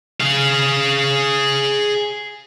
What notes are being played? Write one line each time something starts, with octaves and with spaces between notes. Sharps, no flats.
G#4 F5